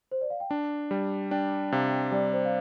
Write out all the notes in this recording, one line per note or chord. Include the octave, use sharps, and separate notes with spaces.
C5
D5
F5
G5
D4 A5
G3 G5
D4 G5
C3 F5
G3 D5
C5
F5